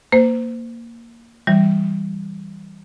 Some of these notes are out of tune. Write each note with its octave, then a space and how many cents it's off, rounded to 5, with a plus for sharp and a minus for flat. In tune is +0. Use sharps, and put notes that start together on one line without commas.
A#3 -5 C5 -30
E3 -10 G3 +0